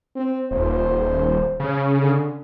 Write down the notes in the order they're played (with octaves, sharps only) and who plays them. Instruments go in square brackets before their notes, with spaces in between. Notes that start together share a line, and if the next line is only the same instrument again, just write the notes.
[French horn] C4
[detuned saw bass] D#1 [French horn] C5
[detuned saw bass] C#3
[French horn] D3